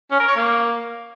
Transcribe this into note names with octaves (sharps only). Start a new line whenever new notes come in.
C#4
A#4
C#5
A#3